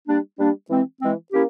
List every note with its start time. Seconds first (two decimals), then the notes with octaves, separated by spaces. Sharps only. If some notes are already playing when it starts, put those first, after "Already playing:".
0.08 G3 A#3 D4
0.39 G3 A#3 D4
0.70 E3 G#3 C4
1.01 E3 G#3 C4
1.32 A#3 C#4 E4 G4